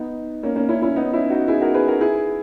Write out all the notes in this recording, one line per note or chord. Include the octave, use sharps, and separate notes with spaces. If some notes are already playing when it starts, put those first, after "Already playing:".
Already playing: B3 D#4
A#3 C#4
A#3 C#4
C#4 E4
C#4 E4
B3 D#4
C#4 E4
D#4 F#4
E4 G#4
F#4 A#4
G#4 B4
F#4 A#4
E4 G#4